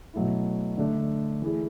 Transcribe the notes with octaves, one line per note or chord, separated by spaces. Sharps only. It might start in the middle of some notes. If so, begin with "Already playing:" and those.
B2 F#3 A3 E4
D3 A3 D4
E3 A3 E4 G#4